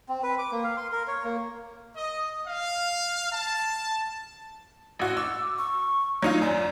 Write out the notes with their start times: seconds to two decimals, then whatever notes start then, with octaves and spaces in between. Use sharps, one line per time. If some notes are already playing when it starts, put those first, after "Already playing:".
0.09 C4
0.23 B4
0.39 D6
0.52 A#3
0.64 F5
0.77 C6
0.92 A#4
1.08 C#5
1.24 A#3
1.96 D#5
2.46 F5
3.32 A5
4.99 A1 F#4
5.17 D6 E6
5.58 C#6
6.23 F#3 D#4 F4
6.42 F#2 D5